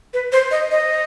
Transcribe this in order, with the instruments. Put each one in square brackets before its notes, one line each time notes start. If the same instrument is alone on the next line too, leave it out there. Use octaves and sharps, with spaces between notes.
[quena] B4
C5
D#5
D#5